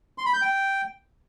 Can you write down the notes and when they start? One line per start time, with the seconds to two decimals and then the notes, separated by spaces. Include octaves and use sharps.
0.18 C6
0.26 B5
0.34 G6
0.42 G5